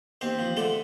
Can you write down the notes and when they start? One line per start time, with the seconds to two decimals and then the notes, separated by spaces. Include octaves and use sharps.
0.21 D#2 C4 C5
0.39 F3
0.57 D3 A3 A4